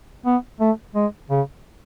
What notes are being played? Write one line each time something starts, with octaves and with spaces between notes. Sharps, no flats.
B3
A3
G#3
C#3